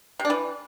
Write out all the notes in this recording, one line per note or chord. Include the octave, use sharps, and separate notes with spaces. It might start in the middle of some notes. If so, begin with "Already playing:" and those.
C3
D4
E3